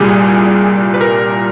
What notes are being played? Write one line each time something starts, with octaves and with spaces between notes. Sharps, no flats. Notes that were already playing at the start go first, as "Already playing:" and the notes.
Already playing: C2 A#2 G3 G#4
B4
A#4